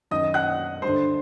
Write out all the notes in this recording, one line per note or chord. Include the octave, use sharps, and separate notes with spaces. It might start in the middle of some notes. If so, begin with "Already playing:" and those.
F#2 D#3 D#5 D#6
F#5 F#6
G2 C5 C6
D3